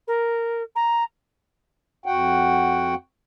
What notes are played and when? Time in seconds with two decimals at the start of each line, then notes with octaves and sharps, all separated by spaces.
0.07 A#4
0.75 A#5
2.06 F2 F#4 F#5 G5